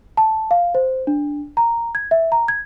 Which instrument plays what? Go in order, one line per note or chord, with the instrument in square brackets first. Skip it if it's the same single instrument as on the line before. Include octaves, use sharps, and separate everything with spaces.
[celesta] A5
F5
C5
D4
A#5
G#6
E5
A#5
G#6